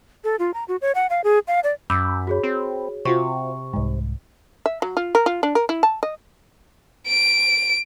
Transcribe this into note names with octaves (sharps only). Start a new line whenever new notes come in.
A4
F4
A#5
F#4
C#5
F#5
F5
G#4
F5
D5
F#2 B5 D6 E6 G6
F#4 G#4 C#5
C4
C3 F4 F#4 C5 C#6
C2 G#2
E5
F#3
F4
A#4
F4
D4
A#4
E4
A5
D#5
D7